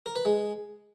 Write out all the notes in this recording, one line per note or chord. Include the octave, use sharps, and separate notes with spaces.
A#4
B4
G#3